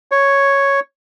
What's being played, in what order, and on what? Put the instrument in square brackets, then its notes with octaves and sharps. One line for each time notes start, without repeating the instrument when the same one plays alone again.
[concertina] C#5